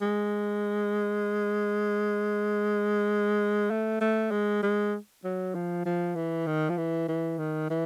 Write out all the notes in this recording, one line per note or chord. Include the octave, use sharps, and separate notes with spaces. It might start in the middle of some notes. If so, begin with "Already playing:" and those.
G#3
A3
A3
G#3
G#3
F#3
F3
F3
E3
D#3
F3
E3
E3
D#3
E3